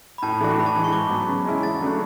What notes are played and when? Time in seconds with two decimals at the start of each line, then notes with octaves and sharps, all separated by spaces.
0.18 B5
0.22 A2 A5
0.41 E3 A3 D4 F#4
0.58 A2 B5
0.66 A5
0.76 E3 G#3
0.84 C#6
0.93 G#2 D6
1.10 F#3 B3
1.28 C#3
1.45 G#3 C#4 E4
1.63 E2 A6
1.81 C#3 F#3 A3 D4